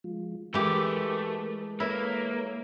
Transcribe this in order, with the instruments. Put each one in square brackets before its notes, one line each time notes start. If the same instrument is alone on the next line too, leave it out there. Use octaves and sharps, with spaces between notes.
[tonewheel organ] F3 G#3 F4
[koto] E3 G4 [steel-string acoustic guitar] G#3 [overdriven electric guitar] A3 [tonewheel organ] A#4
[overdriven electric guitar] A#3 [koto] E4 [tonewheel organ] A4 B4 C#5